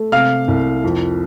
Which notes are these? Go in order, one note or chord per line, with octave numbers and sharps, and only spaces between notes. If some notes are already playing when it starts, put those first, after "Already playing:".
Already playing: A3
C3 F5 F6
C2
F2